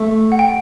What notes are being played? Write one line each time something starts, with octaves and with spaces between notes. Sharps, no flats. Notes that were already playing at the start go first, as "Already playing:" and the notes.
Already playing: A3
F#5
G5